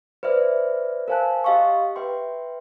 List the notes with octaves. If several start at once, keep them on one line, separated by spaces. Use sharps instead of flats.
B4 C5 D5 E5 F6
A#4 C5 F5 G#5 A5 F#6
G4 D#5 F5 C6 C#6
B4 E5 G5 C6